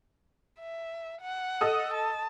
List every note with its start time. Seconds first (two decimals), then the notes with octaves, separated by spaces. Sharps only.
0.59 E5
1.21 F#5
1.61 A4 D#5 D#6
1.94 A5